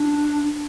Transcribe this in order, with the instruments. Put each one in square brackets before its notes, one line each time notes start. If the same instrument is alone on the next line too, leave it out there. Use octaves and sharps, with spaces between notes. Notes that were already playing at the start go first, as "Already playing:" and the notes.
Already playing: [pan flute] D4